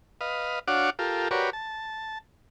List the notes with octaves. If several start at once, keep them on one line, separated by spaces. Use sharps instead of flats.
B4 D#5 F5
D4 F#4 C#5 F5 F#5 D6
F4 G4 A4 A#4
F#4 G4 A#4 B4 C#5 D5
A5